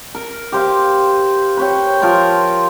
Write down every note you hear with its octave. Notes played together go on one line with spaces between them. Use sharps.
A#4
G4 C5 F5
B4 C#5 G5
F3 F4 A#4 C6